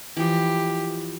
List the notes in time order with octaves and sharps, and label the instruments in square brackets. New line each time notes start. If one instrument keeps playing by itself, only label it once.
[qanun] E3 F3 [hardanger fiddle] G4